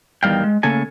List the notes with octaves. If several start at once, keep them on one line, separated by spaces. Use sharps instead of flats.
E2 D#3 G3 F5 G5
G#3
C#3 A3 A#3 A4 G#5